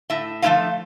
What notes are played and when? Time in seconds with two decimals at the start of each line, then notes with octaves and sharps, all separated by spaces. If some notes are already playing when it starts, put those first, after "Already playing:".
0.10 A2 E5
0.42 F3 A3 C4 E4 E5 F5